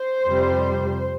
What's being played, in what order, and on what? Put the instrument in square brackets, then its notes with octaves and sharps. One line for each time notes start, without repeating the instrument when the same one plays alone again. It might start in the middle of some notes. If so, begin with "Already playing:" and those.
Already playing: [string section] C5
F2 C3 G3